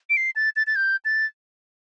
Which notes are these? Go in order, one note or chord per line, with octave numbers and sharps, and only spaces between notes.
D7
C7
A6
A6
A6
G6
A6